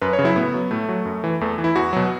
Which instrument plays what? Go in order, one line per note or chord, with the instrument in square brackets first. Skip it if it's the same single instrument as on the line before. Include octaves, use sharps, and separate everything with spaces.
[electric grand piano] F#2 B4
C#5
C#3
F#3 E4
A2 B3
F#3
A2 A3
F#3
F#2
E3
E2 A3
E3
E4
E2 F#4
B2 F#3